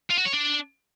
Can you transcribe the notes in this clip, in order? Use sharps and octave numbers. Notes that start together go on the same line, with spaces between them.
F4
F#4
C#5
D4